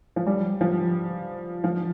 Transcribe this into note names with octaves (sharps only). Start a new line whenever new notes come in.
F3
G3
F3
F3